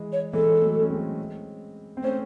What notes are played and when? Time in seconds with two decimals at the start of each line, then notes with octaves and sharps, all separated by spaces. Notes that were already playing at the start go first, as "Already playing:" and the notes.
Already playing: E3 G#3
0.12 C#5
0.33 E3 G#3 A4
0.62 F#3 A3
0.81 C#4
0.90 G#3 C4
1.97 C4
2.03 A3 C#4 C5